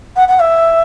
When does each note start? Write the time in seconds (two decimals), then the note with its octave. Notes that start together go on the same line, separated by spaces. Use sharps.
0.16 F#5
0.28 F#5
0.39 E5